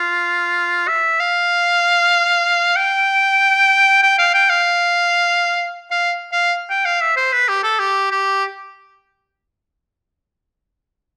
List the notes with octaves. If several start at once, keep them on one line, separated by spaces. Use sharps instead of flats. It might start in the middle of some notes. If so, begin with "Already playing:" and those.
Already playing: F4
E5
F5
G5
G5
F5
G5
F5
F5
F5
G5
F5
E5
C5
B4
G4
A4
G4
G4